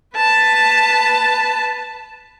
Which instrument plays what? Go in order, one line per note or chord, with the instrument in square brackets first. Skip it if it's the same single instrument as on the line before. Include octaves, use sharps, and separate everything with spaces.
[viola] B4 A5